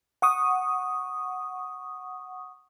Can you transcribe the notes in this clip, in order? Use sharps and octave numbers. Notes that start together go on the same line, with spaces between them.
F#5 C#6 D#6